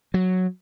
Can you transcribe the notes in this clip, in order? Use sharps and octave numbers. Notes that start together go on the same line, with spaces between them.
F#3